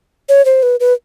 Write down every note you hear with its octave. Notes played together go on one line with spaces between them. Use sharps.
C#5
C5
B4
B4